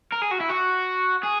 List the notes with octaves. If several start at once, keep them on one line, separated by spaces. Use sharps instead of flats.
A#4
G#4
F#4
E4
F#4
G#4